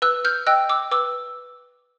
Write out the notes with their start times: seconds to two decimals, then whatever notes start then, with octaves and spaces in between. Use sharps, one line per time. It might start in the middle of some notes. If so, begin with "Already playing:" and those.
0.02 B4 E6 F#6
0.25 F6 G6
0.47 D#5 G5 E6 F#6
0.69 D6 E6
0.91 B4 D6 E6